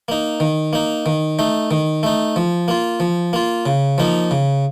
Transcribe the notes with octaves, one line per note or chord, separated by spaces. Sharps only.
A#3 D#4
D#3
A#3 D#4
D#3
A3 D#4
D#3
A3 D#4
F3
A#3 F4
F3
A#3 F4
C#3
F3 A#3 D#4
C#3